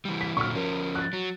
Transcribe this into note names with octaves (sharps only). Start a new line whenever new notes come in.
E3 G3
B6
A#2 D3 F#3 C#6 F6
F3 C#4 A#4
F#6 A6
F#3